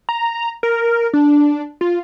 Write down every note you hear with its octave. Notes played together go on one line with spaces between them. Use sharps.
A#5
A#4
D4
F4